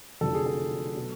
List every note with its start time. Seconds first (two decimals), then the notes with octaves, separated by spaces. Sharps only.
0.21 F1 F2 D3 F#3 A4
0.34 G#4
0.46 A4
0.96 B2 F#3